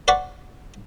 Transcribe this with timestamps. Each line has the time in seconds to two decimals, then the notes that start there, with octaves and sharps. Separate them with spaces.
0.08 C5 D5 F#5 B5 C#6